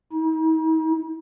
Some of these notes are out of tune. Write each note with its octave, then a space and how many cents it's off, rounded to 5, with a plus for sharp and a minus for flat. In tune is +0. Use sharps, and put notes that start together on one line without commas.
D#4 +45